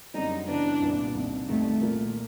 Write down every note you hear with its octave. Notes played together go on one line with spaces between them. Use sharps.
F#2 D3 G3 D#4
C#3 E3 G3 B3 D4
C2 A#2 G3 B3
C2 C3 D#3
C2 C3 D#3 G3 A3 C4
A#2 F3 A#3